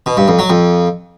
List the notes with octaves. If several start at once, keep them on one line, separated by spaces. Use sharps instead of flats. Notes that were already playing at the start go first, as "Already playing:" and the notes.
B2
G2
F2
F#3
F2